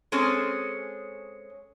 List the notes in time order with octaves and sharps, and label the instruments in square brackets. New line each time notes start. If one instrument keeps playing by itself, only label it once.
[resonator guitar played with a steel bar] G#3 C4 C#4 G#4 A4